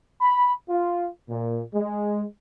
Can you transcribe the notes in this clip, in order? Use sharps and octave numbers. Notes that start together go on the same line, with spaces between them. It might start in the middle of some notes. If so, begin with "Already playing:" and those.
B5
F4
A#2
G#3